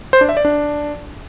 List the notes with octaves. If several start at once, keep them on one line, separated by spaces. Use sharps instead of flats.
C5
D4
E5
D5
D4